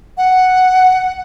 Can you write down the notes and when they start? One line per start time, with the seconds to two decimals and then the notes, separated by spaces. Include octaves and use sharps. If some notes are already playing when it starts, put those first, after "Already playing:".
0.18 F#5